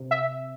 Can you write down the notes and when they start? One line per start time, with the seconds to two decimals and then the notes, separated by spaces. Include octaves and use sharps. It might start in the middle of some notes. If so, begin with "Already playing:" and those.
Already playing: C3
0.11 E5